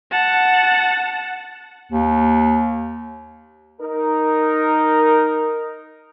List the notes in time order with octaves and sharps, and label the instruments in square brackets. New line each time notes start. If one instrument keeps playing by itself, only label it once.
[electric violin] F#5 A5
[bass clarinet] D#2
[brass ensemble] D#4 A#4